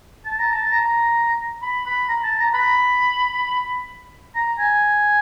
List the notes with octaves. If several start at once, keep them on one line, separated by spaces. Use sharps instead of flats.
A5
A#5
A5
A#5
B5
B5
A#5
A5
A#5
B5
A#5
G#5